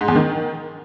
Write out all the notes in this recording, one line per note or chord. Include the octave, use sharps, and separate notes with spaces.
G#2
E2
D#3